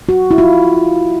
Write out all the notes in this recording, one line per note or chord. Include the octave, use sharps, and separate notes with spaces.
F#4
E4
F4